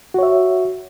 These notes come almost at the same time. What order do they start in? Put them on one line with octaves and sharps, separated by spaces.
F#4 C#5 E5